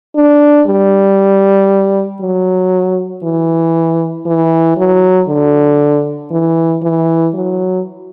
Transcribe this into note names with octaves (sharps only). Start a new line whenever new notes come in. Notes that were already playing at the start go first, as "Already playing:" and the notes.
D4
G3
F#3
E3
E3
F#3
D3
E3
E3
F#3